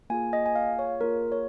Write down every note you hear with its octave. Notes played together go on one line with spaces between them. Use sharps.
A#3 F4 G#4 G#5
D#5
G#5
F5
C#5
A#3 F4 G#4 A#4
C#5